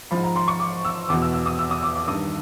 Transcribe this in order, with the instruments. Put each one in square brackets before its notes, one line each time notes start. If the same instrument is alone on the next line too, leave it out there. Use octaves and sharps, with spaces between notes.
[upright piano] G#2 F3 B5
A#5
C6
C#6
D6
E6
E2 B2 D6
E6
E6
D#6
E6
D#6
D6
D6
G2 D#3 D#6